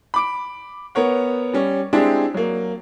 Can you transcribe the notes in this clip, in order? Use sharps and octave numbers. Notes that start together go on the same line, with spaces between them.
B5 D6 D7
B3 A#4 C#5 F#5
G3 C#4
G#3 C4 D4 E4 G4 G#4
F#3 A#3